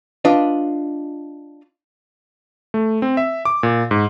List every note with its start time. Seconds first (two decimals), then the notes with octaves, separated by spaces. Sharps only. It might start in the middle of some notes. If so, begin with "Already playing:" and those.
0.25 D4 F4 B4 D#5
2.74 A3
3.02 C4
3.17 E5
3.45 D6
3.63 A#2
3.91 G#2